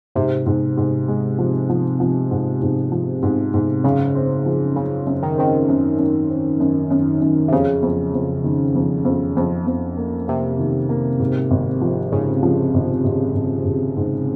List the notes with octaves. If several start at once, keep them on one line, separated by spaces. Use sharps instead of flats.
G#2 C3
G#2
G#2
G#3
F3
F3
F3
G#2
G#2
F3
G#2
G#2
F#2 C#3
C4
F3
F#2 C#3
F#2
D#3
D#3 C4
F#2
F#2
C4
F#2
F#2
F#2
C3
F2 C#3
F2
F2
D#3
F2
F2
F2
F2
A#3
C3 A#3
D#3
A#3
G#2
G#1
F3
G#2 C#3
F3
G#1
G#1
G#1
G#1
G#2